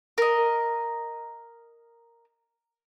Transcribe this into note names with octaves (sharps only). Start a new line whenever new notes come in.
A#4 D#5